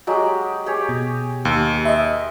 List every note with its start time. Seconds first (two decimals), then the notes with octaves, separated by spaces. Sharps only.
0.07 F#3 G#3 G4
0.66 G4 G#4 C#5
0.89 B2
1.45 D#2
1.85 D#5 E5 C6